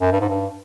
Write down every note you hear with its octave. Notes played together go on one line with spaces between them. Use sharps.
F#2
G2
G#2
G2